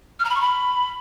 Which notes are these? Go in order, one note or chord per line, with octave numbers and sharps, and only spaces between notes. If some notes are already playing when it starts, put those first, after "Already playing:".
F6
A#5
B5
C#6
B5